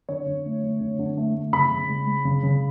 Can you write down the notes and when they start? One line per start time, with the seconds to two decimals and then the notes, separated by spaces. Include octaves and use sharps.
0.09 D3 C#5
0.27 D3
0.46 A3
0.63 A3
0.81 D3
0.99 D3
1.17 A3
1.35 A3
1.53 C#3 B5
1.71 C#3
1.89 G#3
2.07 G#3
2.25 C#3
2.43 C#3